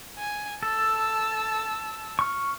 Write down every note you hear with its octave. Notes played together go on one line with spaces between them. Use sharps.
G#5
A4 A5 E6
C#6 F6